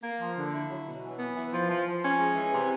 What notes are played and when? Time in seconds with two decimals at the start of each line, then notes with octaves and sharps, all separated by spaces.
0.03 A#3
0.20 F3
0.36 D3
0.52 E4
0.69 F#3
0.86 B2
1.03 E3
1.18 B3
1.36 E3
1.52 F3
1.69 F3
1.85 F3
2.02 C#4
2.18 G#3
2.35 E3
2.52 C3